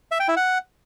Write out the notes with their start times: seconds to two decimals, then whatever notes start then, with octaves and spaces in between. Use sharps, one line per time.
0.11 E5
0.20 G5
0.28 E4
0.37 F#5